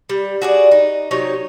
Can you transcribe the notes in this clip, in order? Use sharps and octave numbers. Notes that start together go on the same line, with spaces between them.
G3
F#4 G#4 D5
D#4
C3 F#3 D#4 C#5